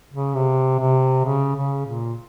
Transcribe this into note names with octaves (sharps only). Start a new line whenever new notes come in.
C#3
C3
C3
C#3
C#3
A#2